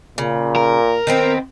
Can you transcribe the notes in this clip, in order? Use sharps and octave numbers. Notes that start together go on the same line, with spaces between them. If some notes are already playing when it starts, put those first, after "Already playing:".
A#2 C#3
A#4
D#3 B3 C4